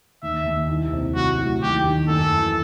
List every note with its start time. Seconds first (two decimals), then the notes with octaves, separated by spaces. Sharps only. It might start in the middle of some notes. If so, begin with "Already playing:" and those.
0.23 D#2 E5
0.46 D#2
0.69 C2
0.93 C3
1.16 F#3 F#4
1.39 A2
1.62 D#2 G4
1.85 D#3
2.09 F#2 A4
2.33 E3